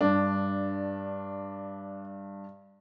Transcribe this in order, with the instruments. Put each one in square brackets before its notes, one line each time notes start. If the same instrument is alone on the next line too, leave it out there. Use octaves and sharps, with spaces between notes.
[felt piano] G2 [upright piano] D4